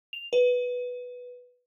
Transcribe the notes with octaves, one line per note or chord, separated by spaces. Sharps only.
F7
B4